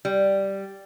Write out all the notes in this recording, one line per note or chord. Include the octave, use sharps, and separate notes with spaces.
G3